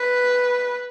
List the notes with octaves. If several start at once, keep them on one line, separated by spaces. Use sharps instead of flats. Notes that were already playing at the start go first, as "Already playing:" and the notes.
Already playing: B4